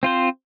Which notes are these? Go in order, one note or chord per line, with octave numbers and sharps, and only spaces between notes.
C4 F4 C5